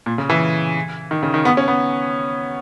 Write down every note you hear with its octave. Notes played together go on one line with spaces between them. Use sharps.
A#2
C#3
E3
D#3
C#3
D#3
B3
C#4
B3